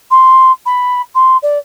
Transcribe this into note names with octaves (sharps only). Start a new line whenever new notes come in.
C6
B5
C6
D5